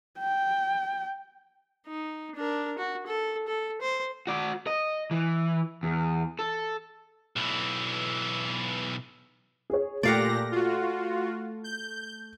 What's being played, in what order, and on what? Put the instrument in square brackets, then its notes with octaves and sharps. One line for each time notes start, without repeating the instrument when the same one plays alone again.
[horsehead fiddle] G5
[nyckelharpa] D#4
D4 A#4
F#4
A4
A4
C5
[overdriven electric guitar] F#4 D5
D#5
E3
E2
A4
[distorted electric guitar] B1 E3
[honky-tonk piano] G#4 C#5
[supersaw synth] A#2 G4 A#6 [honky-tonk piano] A3 [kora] D5 F5 F#5
[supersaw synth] F4 F#4
G6